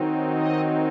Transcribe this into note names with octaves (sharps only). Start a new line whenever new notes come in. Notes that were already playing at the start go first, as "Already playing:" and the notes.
Already playing: D#3 F#3 C4 D#4
D#5